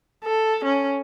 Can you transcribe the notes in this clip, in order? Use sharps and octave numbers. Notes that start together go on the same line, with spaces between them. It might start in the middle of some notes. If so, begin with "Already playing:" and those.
A4
C#4